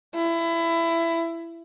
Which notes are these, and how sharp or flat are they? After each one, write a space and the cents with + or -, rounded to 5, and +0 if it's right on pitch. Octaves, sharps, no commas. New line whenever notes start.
E4 +20